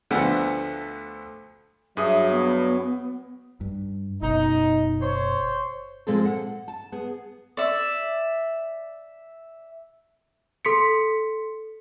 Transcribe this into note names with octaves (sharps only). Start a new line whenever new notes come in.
D2 D3 F3 A3 B3 F#5
G2 F#3 G#4 E5 D#6
B3
G2
F#1 B2 D#4
C5 C#5
A#2 F3 G#3 C4 G#4 A4
F#5
A5
B3 G#4
D5 E5
A4 C6 B6 C#7